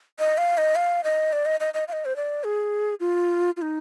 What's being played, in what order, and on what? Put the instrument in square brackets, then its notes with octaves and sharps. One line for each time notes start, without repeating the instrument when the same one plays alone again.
[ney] D#5
F5
D#5
F5
D#5
D5
D#5
D#5
D#5
F5
D#5
C5
D5
G#4
F4
F4
D#4